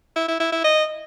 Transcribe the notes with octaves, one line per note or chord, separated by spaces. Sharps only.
E4
E4
E4
E4
D#5